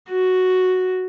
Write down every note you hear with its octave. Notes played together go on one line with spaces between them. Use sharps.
F#4